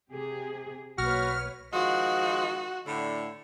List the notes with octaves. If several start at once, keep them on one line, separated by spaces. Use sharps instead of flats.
C3 G4 G#4
B1 A#3 F#4 B4 C#5 F6
D#3 F3 G#3 F#4
A2 D3